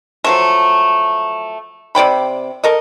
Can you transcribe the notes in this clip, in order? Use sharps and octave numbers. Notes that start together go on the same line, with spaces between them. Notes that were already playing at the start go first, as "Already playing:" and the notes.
F3 F#3 A3
C3 D5 G5 B5
A4 A#4 D#5